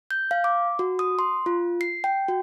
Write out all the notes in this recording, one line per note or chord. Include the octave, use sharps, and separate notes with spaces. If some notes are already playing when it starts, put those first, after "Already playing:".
G6
F5
D6
F#4
D#6
C6
F4
C7
G5
F#4